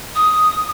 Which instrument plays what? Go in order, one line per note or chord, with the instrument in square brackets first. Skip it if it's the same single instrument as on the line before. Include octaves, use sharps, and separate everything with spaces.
[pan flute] D#6